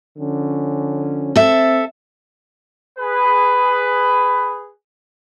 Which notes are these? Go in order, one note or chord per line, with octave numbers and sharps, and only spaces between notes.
D3 F3 C#4
C4 A4 E5
G#4 B4